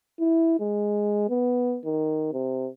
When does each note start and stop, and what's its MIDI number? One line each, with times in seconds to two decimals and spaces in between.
0.19 0.58 64
0.60 1.25 56
1.29 1.78 59
1.85 2.28 51
2.33 2.68 48